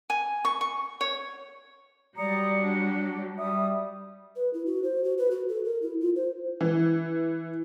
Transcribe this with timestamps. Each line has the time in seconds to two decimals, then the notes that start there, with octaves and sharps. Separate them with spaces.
0.10 G#5
0.45 C#6
0.61 C#6
1.01 C#5
2.18 F#3 G3 D5 A#5 D#6 C#7
2.60 D4 F#4
3.38 G3 E5 D#6
4.36 B4
4.54 E4
4.66 F#4
4.84 C5
5.04 F#4
5.18 B4
5.31 F#4
5.49 A4
5.65 A#4
5.82 E4
6.00 F4
6.16 C5
6.61 E3